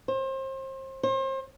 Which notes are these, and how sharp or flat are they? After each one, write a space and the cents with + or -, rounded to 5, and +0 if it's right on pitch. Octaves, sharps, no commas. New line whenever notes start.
C5 +30
C5 +35